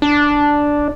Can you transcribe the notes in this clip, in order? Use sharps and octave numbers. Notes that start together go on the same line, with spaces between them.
D4